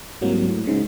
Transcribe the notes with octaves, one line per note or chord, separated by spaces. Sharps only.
C2 G#2 F#3 A#3
A2
G#2 C#3